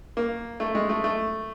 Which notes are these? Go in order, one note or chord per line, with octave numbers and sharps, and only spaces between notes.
A#3
A3
G#3
A3
A3